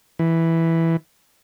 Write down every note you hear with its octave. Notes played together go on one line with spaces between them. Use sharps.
E3